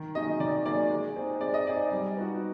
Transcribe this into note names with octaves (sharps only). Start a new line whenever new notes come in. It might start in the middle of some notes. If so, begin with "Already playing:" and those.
Already playing: D#3
F#3 A#3 D#4 G#4 D#5
D#3 D5
F#3 A#3 D#4 G#4 D5
G#3
C4 D#4 G#4
G#3 D5
D#5
C4 D#4 G#4 D5
G3
B3 D#4 F#4